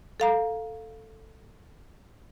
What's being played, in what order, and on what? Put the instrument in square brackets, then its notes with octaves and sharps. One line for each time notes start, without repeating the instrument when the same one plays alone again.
[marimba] A4 F5 A#5